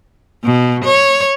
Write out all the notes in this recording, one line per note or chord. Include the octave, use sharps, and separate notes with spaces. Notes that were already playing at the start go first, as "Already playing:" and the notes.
B2
C#5